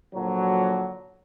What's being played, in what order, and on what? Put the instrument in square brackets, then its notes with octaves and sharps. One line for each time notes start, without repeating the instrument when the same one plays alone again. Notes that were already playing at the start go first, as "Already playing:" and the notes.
[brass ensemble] A#2 D3 F3 F#3